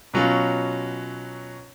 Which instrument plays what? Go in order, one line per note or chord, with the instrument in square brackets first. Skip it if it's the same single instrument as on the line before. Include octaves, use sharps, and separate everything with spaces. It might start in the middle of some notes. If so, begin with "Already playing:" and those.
[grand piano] B2 F#3 C#4 F4